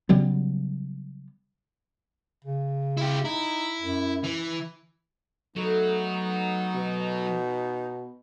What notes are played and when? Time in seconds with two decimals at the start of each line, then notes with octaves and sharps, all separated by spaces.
0.09 C#3 F#3 G3 B3
2.44 C#3
2.97 E4 G4
3.25 D#4 E4
3.81 F#2
4.24 E3
5.56 F#3 A3 B3 D#4
6.75 B2